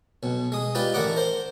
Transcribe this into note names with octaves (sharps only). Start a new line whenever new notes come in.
B1 B2
G#3 D#6
D#4 F4 G4 B4 D5
A1 A3 A#4 D5 F#5 D6
A#4 C5